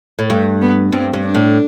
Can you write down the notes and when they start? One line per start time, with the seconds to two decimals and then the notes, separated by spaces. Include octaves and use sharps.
0.19 A2
0.30 G2 A3
0.61 B3
0.92 G2 C4
1.13 G2
1.24 D4
1.35 A2